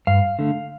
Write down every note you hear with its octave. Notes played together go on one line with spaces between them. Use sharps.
G2 F5
D3 A3